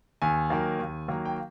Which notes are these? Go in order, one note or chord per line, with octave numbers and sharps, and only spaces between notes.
D#2 G#5
D#3 F#3 A#3
D#2
D#3 F#3 A#3
G5